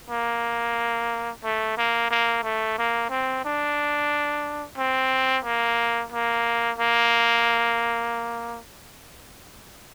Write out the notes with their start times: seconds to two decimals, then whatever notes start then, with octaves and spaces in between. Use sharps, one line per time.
0.10 A#3
1.44 A3
1.78 A#3
2.11 A#3
2.44 A3
2.78 A#3
3.10 C4
3.45 D4
4.78 C4
5.44 A#3
6.12 A#3
6.78 A#3